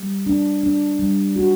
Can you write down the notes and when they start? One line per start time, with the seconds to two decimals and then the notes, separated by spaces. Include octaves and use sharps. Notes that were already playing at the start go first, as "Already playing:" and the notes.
Already playing: G3
0.26 D4
0.63 D4
0.99 G3
1.36 F#4